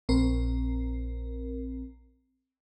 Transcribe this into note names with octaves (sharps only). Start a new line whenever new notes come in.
A#1 C4 A#4